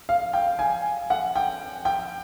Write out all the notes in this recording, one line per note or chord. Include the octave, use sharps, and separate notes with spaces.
F5
G5
G#5
F#5
G5
G5